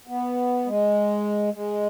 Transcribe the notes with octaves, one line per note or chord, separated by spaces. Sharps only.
B3
G#3
G#3